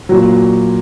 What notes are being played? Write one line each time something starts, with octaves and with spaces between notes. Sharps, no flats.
A#2 F#3 F#4